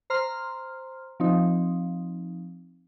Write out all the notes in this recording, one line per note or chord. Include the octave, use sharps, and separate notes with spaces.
C5 A#5 C6 F6
F3 C4 D#4